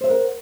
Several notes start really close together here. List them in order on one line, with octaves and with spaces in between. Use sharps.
C5 E5 F#5 A#4